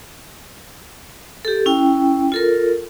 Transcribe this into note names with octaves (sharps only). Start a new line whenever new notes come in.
G4 A4
C#4 E4 G5
F4 A4 A#4